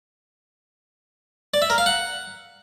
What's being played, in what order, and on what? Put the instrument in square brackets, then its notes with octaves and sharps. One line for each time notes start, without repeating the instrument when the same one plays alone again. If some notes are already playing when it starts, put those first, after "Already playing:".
[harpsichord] D5
E5
A#4
F5
F#5